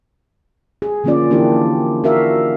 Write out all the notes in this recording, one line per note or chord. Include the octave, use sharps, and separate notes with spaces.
G#4
D3 F3 A#3 C#4 F4 D5
E3 A#3 D4 E4 G4 G#4
F#4 A#4 E5 F5